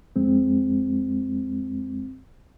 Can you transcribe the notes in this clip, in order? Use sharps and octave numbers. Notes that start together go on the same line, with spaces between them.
F2 G#3 C4